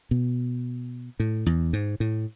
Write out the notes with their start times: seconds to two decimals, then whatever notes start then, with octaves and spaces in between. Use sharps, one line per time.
0.11 B2
1.20 A2
1.46 E2
1.73 G#2
2.00 A2